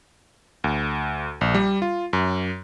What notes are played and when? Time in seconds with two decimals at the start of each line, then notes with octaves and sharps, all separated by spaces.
0.64 D2
1.41 A#1
1.55 G3
1.82 F4
2.13 F#2